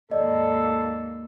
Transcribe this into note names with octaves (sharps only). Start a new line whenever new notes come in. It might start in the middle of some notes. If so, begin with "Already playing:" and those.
D#2 G#2 A4 D5 D#5